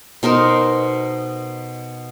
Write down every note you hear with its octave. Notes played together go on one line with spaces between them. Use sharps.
B2 D#4 A#4 C5